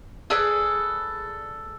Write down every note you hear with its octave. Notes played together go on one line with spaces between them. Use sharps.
G#4 A4 B4 D5